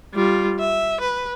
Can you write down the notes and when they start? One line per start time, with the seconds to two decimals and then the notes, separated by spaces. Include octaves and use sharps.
0.14 G3 F4
0.59 E5
1.01 B4